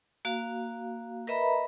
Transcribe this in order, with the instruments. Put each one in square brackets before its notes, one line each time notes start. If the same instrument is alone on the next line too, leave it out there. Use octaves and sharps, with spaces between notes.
[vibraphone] A#3 F#4 F5
A#4 B4 D#5 E5 A#5 B5